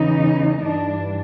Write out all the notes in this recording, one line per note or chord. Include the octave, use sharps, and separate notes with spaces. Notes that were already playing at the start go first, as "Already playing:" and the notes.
Already playing: E2 C#3 E3 D#4
G2 E3 D4